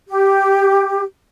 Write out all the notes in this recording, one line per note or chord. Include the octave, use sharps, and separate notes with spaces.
G4